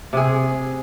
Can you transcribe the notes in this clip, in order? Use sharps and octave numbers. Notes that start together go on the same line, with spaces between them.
C3 G#4